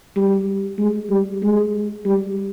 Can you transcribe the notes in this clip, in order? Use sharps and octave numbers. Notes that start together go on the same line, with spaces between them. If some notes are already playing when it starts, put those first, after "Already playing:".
G3
G#3
G3
G#3
G3